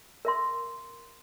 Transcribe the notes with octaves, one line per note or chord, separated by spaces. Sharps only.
A#4 E5 C6